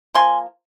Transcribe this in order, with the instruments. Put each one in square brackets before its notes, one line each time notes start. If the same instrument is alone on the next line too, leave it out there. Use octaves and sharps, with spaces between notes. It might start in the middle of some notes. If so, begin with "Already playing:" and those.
[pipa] F3 A#3 G#5 C6